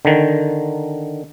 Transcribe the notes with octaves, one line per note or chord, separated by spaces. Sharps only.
D3 D#3